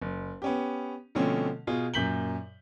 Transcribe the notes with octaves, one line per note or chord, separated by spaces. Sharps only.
F#1
B3 C#4 G4
B2 D3 F3 A3 C4 C#4
B2 F4 G#4
F#2 A#2 G6 B6 F#7 G7